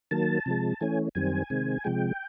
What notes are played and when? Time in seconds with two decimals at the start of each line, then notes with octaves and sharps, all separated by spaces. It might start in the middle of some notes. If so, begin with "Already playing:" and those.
0.11 D#3 F#3 A#3 A5
0.46 C3 F3 G#3
0.81 E3 A3 C#4 G#5
1.15 F#2 D#3 G3 C4 G#5
1.50 C3 D#3 G#3 C4
1.84 C3 F3 G#3 G5